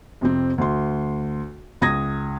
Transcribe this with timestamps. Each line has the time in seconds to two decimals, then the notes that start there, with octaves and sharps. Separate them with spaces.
0.21 F2 C3 C4
0.58 D2 C6
1.81 C#2 D#6 G#6 A#6